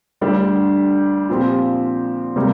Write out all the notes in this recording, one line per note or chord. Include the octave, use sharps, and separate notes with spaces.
D2 D3 G3 D4 G4
A#2 F3 C4 G4
C3 G3 A#3